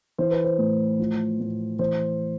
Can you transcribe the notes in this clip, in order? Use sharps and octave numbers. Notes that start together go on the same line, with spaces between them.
E3 C5
B4
C5
A2
F3
A2
E3 C5